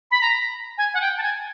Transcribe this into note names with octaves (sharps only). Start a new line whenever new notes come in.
B5
A#5
G#5
F#5
G5
A5
G#5